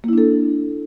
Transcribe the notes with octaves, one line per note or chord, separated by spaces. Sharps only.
A#3 D4 E4 A4